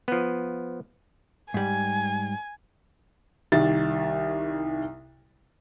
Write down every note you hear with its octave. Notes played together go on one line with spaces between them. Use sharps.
F3 B3
G#2 G3 G#5
C2 D#3 G3 A6